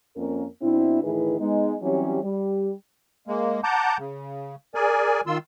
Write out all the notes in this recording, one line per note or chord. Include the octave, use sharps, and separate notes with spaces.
F2 A#3 C#4 A#4
B2 C4 D4 E4
A2 D#3 E3 E4 G#4 B4
G#3 B3 D#4
E3 F#3 G3 C4 C#4 G4
G3
G#3 A#3
F#5 A5 A#5 D6 G6
C#3
G#4 A#4 D5 G#5
D#3 F4 C6 E6